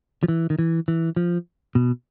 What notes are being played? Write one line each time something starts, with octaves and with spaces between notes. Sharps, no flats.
F3
E3
D#3
E3
E3
F3
B2